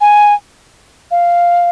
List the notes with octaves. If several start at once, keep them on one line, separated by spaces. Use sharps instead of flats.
G#5
F5